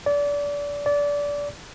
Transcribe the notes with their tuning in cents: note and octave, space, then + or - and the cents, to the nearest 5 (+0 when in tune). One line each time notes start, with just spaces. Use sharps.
D5 -25
D5 -20